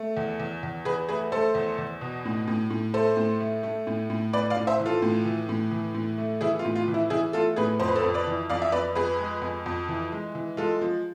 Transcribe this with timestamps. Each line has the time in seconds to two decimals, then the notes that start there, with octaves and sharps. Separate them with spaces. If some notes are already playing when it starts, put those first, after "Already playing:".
Already playing: A3
0.17 E2
0.40 E2
0.63 E2
0.85 E2 G#4 B4
1.09 A3 G#4 B4
1.32 A3 A4 C5
1.55 E2
1.78 E2
2.01 B2
2.25 A2
2.48 A2
2.70 A2
2.94 A3 A4 C5
3.17 A2
3.40 A3
3.63 A3
3.87 A2
4.10 A2
4.33 A2 B4 D5
4.50 D5 F5
4.56 A2
4.67 C5 E5
4.80 E3
4.85 F4 A4
5.02 A2
5.25 E3
5.49 A2
5.71 E3
5.94 A2
6.18 A3
6.41 E3 E4 G#4
6.59 F4
6.65 A2
6.76 F4
6.88 E3
6.94 E4
7.10 E3 E4 G#4
7.33 A3 F4 A4
7.56 A2 G#4 B4
7.80 F2 C5
7.88 B4
7.95 A4 C5
8.03 F2
8.14 B4 D5
8.27 E3
8.50 F2 D5 F5
8.62 E5
8.72 F2 B4 D5
8.95 F2 G#4 B4
9.19 G#3
9.42 F2
9.66 F2
9.89 E3
10.12 G#3
10.35 E3
10.57 G#3 F4 A4
10.81 F3